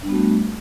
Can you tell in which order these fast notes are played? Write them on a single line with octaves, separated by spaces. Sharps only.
D4 G3 B3 F#4 A3